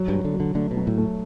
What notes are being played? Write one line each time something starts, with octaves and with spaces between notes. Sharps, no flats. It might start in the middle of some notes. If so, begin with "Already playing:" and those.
Already playing: F#3
G2
F#3
D3
F#3
D3
D3 A3
B2
F#3
A2
A3